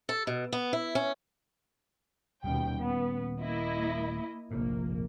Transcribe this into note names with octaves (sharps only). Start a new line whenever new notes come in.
A4
B2
B3
E4
C#4
D#1 D#2 B2 G3 C#4 G5
B3
A#3 E4 D#5
F1 A#1 F2 G#2 A#3